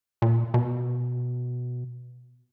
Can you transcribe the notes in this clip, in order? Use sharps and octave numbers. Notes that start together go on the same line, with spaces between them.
A#2
B2